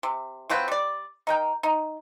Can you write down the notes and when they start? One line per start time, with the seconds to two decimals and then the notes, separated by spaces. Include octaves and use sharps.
0.03 C3
0.50 F3 F#3 C4 B4
0.68 G3 D5
1.27 D#4 A#4 G5
1.63 D#4